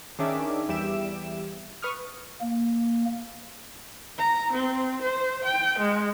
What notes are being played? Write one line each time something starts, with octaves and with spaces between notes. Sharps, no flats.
D#3 C#4 D4 G#4 E5 D6
E2 G3 G4 E5 D7 E7
B4 C#6 D#6 F6
A#3
A#5
C4
C5
G5
G#3